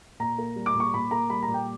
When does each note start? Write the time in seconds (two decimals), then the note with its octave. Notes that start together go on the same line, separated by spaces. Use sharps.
0.20 A#2 A#5
0.38 A#3
0.56 G3
0.66 D6
0.75 A#2
0.80 C#6
0.94 A#2 B5
1.11 A#3 A#5
1.30 G3 B5
1.43 A#5
1.48 A#2
1.54 G5